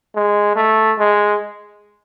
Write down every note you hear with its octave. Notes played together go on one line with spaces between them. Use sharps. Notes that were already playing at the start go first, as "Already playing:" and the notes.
G#3
A3
G#3